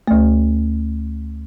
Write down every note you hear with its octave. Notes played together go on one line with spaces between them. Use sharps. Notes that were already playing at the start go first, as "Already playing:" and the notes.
D2 A3